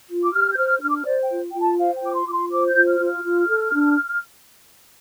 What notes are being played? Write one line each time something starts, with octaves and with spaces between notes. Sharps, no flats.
F4
D6
G4 F6
G6
C5 F6
D4 F6
D6
F6
C5 D5
G5
F4
F4 G5
A5
C5 F5
G5
F4 D6
C6
F4 D6
C6
C5 D6
G6
F4
F6
F4
F6
F4
A4
D4